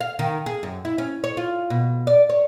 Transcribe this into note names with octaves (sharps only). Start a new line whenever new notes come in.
F5
D#3
G#4
F#2
E4
C#4
C#5
F4
B2
D5
C#5